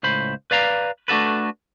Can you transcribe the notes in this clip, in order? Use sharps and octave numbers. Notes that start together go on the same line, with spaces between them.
C#2 A2 C5 B5
B4 D5 F5 A#5
A3 D4 F#4 A4 B4